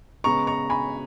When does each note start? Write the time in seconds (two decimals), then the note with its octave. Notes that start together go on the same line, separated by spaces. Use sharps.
0.24 C#3 G#3 B3 A#5 C#6
0.47 A#5 C#6
0.70 G#5 B5